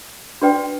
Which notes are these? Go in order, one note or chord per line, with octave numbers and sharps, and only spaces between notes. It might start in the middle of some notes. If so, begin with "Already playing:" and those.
D4 F#4 B4 D5 G5